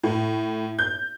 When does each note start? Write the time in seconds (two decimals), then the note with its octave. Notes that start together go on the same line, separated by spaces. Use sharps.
0.03 A2
0.79 G6